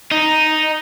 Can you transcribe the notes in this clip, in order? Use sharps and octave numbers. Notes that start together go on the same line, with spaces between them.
D#4